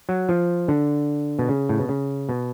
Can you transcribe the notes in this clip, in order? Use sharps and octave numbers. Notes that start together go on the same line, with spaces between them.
F#3
F3
D3
B2
C#3
A2
B2
C#3
B2